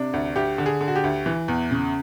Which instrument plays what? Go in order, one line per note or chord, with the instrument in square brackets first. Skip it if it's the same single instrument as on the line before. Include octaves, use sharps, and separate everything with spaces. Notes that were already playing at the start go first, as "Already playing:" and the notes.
Already playing: [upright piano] C3 D4
D2
D2 G4
D3
G#4
D3
F#4
G4
D2
E3
E2
C#3